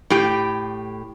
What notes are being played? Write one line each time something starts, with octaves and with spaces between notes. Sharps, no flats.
A2 G4